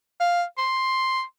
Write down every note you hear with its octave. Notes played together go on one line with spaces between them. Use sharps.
F5
C6